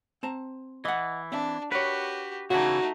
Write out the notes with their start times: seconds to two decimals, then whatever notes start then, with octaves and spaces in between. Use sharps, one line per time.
0.23 C4 A5 A#5
0.85 E3 D#5 F#5
1.32 C4 D4 E5
1.72 F#4 G4 A#4 B4 C#5
2.50 C#3 E3 A3 D#4 F#4 F#5 A#5